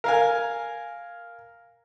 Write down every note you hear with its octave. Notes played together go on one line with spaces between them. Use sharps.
A#4 F5 G#5